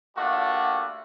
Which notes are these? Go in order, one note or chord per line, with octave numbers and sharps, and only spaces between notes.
G3 A3 A#3 D4 F4 F#4